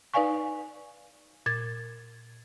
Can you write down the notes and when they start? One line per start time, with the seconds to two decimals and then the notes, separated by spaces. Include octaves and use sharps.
0.14 D#4 B4 D5 F5 G#5 C#6
1.46 A#2 G#6 A6